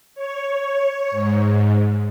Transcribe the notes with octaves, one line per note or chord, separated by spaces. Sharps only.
C#5
G#2